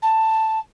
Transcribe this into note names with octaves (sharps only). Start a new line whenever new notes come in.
A5